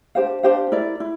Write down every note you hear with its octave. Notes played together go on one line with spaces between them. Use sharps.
D4 G4 C5 F5
D4 G4 C5 F5
E4 A#4 D5
E4